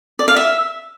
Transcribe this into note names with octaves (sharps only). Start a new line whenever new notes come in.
D5
F5
E5